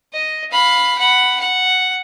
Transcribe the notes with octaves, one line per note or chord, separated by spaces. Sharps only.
D#5
F5 B5
F#5 B5
F#5